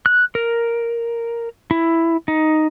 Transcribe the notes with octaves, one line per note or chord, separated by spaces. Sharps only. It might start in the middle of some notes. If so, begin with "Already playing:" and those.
F#6
A#4
E4
D#4